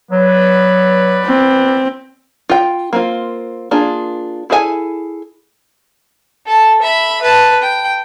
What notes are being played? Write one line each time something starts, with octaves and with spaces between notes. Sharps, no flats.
F#3 B3 B4 D5
C4
F4 G5
A#3 C4 F4
A#3 D4 F4 G#4
E4 G#4 A4 D#5 G#5
A4 A5
E5 B5
B4 A5
G5